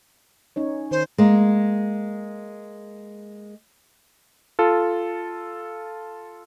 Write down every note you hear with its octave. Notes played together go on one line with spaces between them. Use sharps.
C#4 D#4 C#5
D#3 C5
G#3 A#3
F4 A4